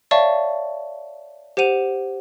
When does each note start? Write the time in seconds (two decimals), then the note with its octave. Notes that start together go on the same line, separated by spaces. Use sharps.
0.11 C#5 D5 E5 F5 A5 C#6
1.57 G4 C5 F#5 D#7 F7